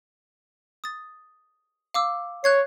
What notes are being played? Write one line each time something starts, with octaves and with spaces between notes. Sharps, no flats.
D#6 A6
F5 D6 E6
C#5 F#6 G#6 C7